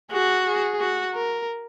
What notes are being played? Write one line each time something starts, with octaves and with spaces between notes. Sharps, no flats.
F#4 G#4
G#4
F#4
A#4